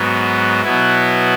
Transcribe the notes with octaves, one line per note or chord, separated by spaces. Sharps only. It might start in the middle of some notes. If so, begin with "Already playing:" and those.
Already playing: G#2 F#3 B3
B2 F#3 B3 E4